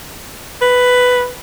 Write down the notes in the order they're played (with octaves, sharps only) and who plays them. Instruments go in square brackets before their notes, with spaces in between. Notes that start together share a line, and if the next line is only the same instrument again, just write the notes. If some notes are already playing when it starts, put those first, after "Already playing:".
[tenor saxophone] B4